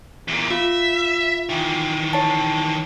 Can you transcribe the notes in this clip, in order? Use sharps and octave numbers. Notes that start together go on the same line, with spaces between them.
E2 A#2
F4 E5
D#3 E3
C#5 A5